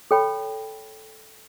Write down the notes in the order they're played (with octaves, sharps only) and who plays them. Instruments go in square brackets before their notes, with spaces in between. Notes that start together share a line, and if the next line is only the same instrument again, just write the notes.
[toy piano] A4 C#5 G5 B5